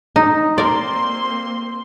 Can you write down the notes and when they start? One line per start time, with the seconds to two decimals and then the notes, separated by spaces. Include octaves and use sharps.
0.16 D#4
0.58 A#3 C4 A#4 D5 C6